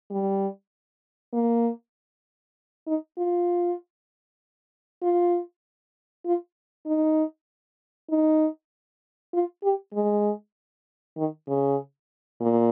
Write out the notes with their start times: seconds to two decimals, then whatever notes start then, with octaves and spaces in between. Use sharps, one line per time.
0.10 G3
1.33 A#3
2.87 D#4
3.18 F4
5.02 F4
6.26 F4
6.86 D#4
8.10 D#4
9.33 F4
9.63 G4
9.94 G#3
11.17 D#3
11.48 C#3
12.41 A#2